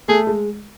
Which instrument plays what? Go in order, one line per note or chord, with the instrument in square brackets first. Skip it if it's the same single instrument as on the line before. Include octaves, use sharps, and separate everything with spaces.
[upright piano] A3 [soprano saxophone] G#4
[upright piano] G#3